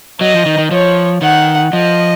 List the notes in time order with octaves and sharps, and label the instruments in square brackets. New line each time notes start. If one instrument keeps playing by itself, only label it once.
[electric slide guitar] F#3 [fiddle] D#5
[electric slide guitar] F3
D#3
D#3
[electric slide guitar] F3 [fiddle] C#5
[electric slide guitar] D#3 [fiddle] F#5
[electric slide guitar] F3 [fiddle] D#5